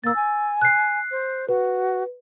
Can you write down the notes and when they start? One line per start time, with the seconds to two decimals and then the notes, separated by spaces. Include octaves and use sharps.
0.04 A#3 E6 A6
0.16 G#5
0.61 F#6 C7
1.11 C5
1.49 F#4 B4